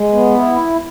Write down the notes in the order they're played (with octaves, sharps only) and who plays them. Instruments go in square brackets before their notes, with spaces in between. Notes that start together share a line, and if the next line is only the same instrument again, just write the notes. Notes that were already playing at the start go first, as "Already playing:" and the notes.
Already playing: [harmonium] G#3
B3
E4